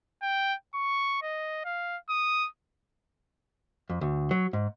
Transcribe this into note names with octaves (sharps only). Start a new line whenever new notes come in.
G5
C#6
D#5
F5
D#6
F2
D2
F#3
G#2